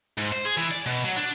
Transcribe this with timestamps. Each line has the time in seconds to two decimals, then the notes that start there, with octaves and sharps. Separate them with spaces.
0.17 G#2
0.32 C5
0.45 G#4
0.57 E3
0.71 D5
0.86 B2
1.04 F#3
1.16 D4